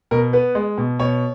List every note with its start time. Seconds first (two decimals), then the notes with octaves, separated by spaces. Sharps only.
0.11 B2 A#4
0.33 B3 B4
0.55 G#3
0.78 B2
0.99 B2 C#5